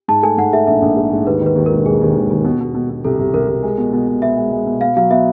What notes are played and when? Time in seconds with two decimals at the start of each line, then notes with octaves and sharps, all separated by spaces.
0.08 G#2 A5
0.23 A3 G#5
0.38 G#2 F#5
0.53 A3 E5
0.67 A#1 E5
0.82 A#1
0.97 A3
1.12 G#2
1.27 D#2 B4
1.41 D#3 B4
1.56 D#2
1.66 A#4
1.72 E1
1.86 G#3 G#4
2.01 D#2
2.15 D#3
2.30 D#2
2.44 B2
2.60 B2
2.74 B2
2.90 B2
3.04 C2 A4
3.19 C2
3.34 C2 A#4
3.48 C2
3.63 G#3
3.78 B2
3.93 B2
4.08 B2
4.22 B3 E5
4.36 G#3
4.51 G#3
4.66 B2
4.81 B3 F5
4.97 F#3 F5
5.10 B3 E5